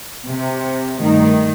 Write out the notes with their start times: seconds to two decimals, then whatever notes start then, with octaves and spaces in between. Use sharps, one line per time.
0.25 C3
0.98 G2 D#3 A3